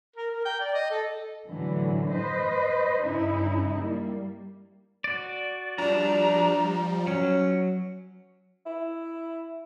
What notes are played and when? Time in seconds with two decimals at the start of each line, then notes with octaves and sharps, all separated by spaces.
0.16 A#4
0.31 A#4
0.45 G5
0.60 D5
0.74 D#5
0.91 A4
1.48 A2 D3 E3 F#3
2.11 B4 C5 D#5
3.03 G2 C#3 D#4 E4
3.78 G3 A#3
5.04 F#4 D5
5.78 F3 G3 D4 A#5
7.07 F#3 C#4
8.66 E4